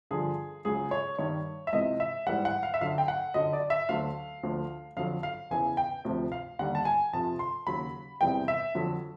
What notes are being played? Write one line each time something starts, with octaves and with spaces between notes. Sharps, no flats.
G2 D3 F3 G#4
C#2 C#3 F#3 G#4
C#5
G2 D#3 G3 C#5
E5
C#2 C3 E3 D#5
E5
G#2 E3 G3 F#5
F#5
F5
E5
F#2 D3 F#3 F5
G5
F#5
F#2 D3 F#3 D#5
D5
E5
D2 D3 F#3 F5
D2 D3 F3
F2 D3 F#3 F5
F5
E2 C#3 E3 G#5
G5
D2 C3 F3
F5
D#2 D3 G3 F#5
A5
G#5
F2 C3 F3 A5
C6
D#2 C#3 F#3 B5
E2 C3 E3 G3 G5
E5
F2 D3 F#3